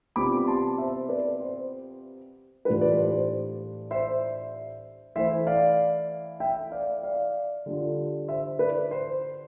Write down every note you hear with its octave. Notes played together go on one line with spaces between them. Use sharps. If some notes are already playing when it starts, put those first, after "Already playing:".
C3 G3 B3 F4 B5 D6
A5 C6
C5 E5
B4 D5
C5
A2 E3 G3 D4 F4 B4
B4 D5
C5
C5
C5 E5
E3 A3 E4 C5 E5
D5 F5
E5 G5
D5 F5
D5 F5
D3 G3 D4 F4
C5 E5
B4 D5
C5